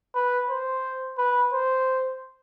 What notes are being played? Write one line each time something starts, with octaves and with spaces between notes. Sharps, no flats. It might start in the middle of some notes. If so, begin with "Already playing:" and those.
B4
C5
B4
C5